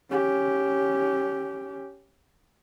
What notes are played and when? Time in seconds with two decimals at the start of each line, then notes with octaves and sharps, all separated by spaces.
0.10 C#4 G4